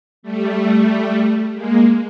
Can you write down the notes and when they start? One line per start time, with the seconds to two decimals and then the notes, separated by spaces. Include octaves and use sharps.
0.23 G3 A3
1.54 G#3 A#3